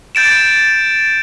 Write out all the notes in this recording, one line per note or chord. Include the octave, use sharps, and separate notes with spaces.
G6 A6 D7 E7